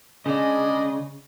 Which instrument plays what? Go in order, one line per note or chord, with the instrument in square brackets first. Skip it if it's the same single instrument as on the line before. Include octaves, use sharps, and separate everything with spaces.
[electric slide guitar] C#3 [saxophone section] G#3 D4 D#5